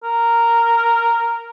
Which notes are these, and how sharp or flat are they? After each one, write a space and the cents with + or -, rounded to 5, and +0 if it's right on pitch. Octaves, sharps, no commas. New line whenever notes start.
A#4 -5